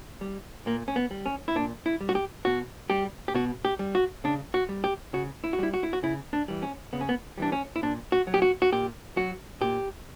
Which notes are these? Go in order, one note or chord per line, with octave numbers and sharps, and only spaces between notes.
G3
A#2 A#3
C#4
B3
G3
C#4
E4
A#2 D4
E4
G3
F#4
G4
B2 F#4
G3 G4
G4
B2 F#4
G4
G3
F#4
C#3 D4
F#4
G3
G4
C#3 F#4
E4
F#4
G3 E4
F#4
E4
F#4
C#3 E4
D4
E3 G3
C#4
C#3 B3
C#4
B3
E3 G3 D4
C#4
E4
A#2 D4
F#4
F#3
G4
F#4
F#4
A#2 G4
F#3 F#4
A#2 G4